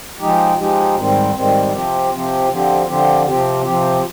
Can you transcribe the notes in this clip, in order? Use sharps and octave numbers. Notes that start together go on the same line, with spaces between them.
F3 G#3 D#4 G4
F3 G#3 D#4 G4
G#2 D#3 G3 C4
G#2 D#3 G3 C4
C3 F3 C4 G4
C3 F3 C4 G4
D3 F3 C4 G4
D3 F3 C4 G4
C3 F3 C4 G4
C3 F3 C4 G4